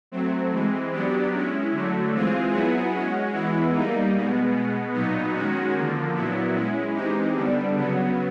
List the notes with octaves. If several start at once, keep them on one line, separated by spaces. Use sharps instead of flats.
F#3 A3 C4
E3 G#3 C4
F#3 B3 D4 G4
G#3 C#4 E4
D3 F#3 A3
E3 G#3 C4 F4 G#4
F#3 B3 E4 G#4
G#3 C#4 F#4
E3 G#3 B3 E4
G3 A#3 D#4
B2 G#3 B3
B2 G#3 B3
A#2 F#3 B3 D#4
D#3 G#3 C#4 F#4
D3 F3 A#3
A#2 F#3 B3 E4
G#3 C#4 E4
E3 G#3 C4 D#4 G4
D3 G3 B3 D4
C#3 F#3 B3